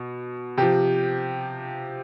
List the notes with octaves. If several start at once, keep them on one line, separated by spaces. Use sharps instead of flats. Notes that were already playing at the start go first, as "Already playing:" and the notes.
Already playing: B2
C3 F3 G4